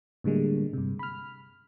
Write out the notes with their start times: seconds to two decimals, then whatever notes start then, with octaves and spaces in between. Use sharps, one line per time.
0.24 A2 D3 G3 G#3 A#3
0.73 G2 C3
0.99 B5 F6